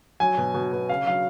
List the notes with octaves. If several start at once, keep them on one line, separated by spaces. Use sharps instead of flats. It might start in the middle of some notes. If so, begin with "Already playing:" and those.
F#3 G#5
B2
B2
B2
C#3 F5
F#3 F5